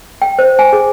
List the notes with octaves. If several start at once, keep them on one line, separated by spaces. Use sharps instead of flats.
G5
C5
G#5
G#4